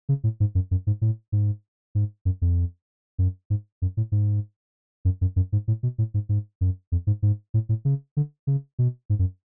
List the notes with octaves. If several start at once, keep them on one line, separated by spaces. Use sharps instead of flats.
C#3
A2
G#2
F#2
F#2
G#2
A2
G#2
G#2
F#2
F2
F#2
G#2
F#2
A2
G#2
F#2
F#2
F#2
G#2
A2
B2
A2
G#2
G#2
F#2
F2
G#2
G#2
A2
A2
C#3
D3
C#3
B2
G#2
F#2